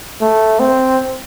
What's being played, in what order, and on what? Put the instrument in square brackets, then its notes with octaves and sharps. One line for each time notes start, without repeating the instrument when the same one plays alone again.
[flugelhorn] A3
C4